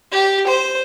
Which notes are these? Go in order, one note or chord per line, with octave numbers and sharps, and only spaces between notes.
G4
C5